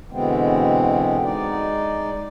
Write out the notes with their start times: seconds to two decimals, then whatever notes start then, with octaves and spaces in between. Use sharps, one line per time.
0.11 B2 D3 E3 G#3 B3 C4
1.23 G#3 D#4 D5